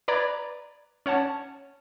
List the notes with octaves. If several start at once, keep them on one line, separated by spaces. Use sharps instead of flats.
B4 D5 A#5 B5 G#6
C#4 C#5 F#5 A5